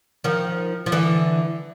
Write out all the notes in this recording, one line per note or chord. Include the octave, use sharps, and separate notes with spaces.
D#3 F3
F3
D3 E3